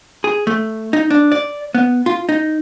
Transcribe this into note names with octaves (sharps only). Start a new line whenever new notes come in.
G#4
A3
D#4
D4
D5
B3
F4
D#4